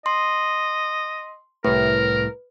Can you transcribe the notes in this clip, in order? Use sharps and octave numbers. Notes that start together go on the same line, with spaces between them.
D#5 C6
C2 A2 A#4 B4